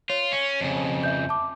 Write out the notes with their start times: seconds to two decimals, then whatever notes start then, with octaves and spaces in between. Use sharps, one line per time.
0.10 F4 C#5
0.33 C#4
0.61 F2 C#3
1.03 E5 G6
1.29 A5 D6